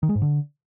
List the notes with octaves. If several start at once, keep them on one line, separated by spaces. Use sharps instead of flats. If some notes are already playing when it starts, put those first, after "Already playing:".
D#3
G#3
G#2
D3